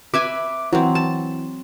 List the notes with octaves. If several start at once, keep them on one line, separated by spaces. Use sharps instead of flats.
B4 E5 G#5 D6
E3 F#3 C4
A5